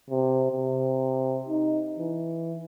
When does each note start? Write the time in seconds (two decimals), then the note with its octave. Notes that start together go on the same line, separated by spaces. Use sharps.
0.10 C3
0.52 C3
1.48 D#4
1.98 E3